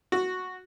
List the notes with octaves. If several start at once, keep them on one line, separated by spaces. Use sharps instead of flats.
F#4